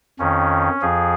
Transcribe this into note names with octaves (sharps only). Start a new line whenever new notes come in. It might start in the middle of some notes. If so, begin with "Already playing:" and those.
F2 D#3 C#4
F2 F3 G#4